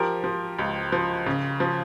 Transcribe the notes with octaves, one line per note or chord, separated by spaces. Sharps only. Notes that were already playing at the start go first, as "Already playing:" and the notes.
Already playing: F3 G4 A#4
F3
C#2
F3
C#3
F3